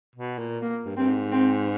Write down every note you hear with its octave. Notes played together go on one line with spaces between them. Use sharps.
B2
A#2
A#3
G2
G2 C4
G#2
C4